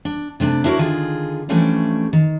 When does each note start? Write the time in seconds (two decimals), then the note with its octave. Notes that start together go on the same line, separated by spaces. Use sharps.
0.05 D4
0.40 C3 A3 D4
0.64 D4 E4 F#4 A#4 C5 C#5
0.79 D3 D#3 F4 G#4
1.49 E3 F3 G3 A3 C#4 D4
2.13 D#3